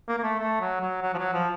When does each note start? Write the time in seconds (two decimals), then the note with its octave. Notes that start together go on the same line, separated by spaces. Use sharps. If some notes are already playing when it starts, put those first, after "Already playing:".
0.08 A#3
0.19 A#3
0.23 A3
0.40 A3
0.61 F#3
0.81 F#3
1.03 F#3
1.14 F3
1.18 F#3
1.34 F3